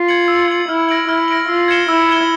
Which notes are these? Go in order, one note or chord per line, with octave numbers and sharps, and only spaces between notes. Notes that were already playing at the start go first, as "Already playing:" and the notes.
Already playing: F4
G#6 C#7 F#7
E6
G#6 C#7 F#7
E4 F6
A#6 D7 F#7
E4 F6
A#6 D7 F#7
F4 E6
G#6 C#7 E7 G7
E4 E6
G#6 C#7 E7 G7